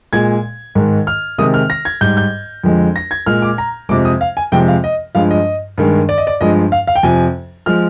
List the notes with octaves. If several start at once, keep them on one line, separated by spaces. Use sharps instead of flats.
A#2 G#3 G#6
G#2 D#3 G#3
F6
C3 D#3 G#3 D#6
F6
A#6
G#6
G#2 G3 G6
G6
F2 D3 F3 G#3
A#6
G#6
A#2 G#3 F6
D6
A#5
F2 C3 F3 G#3 D6
D#6
F5
G#5
F2 C3 F3 G#3 G5
F5
D#5
G2 F3 G#3 F5
D#5
G2 D#3 G#3
D5
D#5
D5
G2 F3 G#3 D#5
F5
F5
G5
F2 C3 F3 G#5
F3 G#3 F6